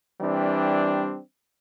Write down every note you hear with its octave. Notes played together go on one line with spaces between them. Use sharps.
E3 G3 C4 D4